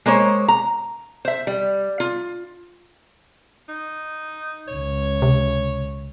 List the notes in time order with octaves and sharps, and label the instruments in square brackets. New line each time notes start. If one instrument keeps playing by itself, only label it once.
[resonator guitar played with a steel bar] G#3 A#3 C5 C#5
A#5
C5 E5
G3
F4
[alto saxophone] D#4
[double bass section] C#2 C#3 [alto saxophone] C#5
[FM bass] C3